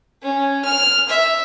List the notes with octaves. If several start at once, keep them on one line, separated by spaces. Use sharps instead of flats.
C#4
F6
E5